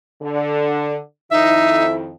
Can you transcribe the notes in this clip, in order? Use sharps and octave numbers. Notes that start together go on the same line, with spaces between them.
D3
F2 D#3 D#4 E4 E5